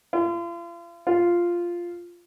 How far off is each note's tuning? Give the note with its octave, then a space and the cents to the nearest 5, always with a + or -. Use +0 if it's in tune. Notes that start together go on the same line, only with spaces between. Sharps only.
F4 -40
F4 -5